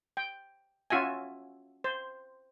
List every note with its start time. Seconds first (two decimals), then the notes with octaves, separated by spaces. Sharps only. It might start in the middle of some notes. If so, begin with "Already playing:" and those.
0.17 G5
0.90 C#4 F4 F#4 E5 G#5
1.84 C5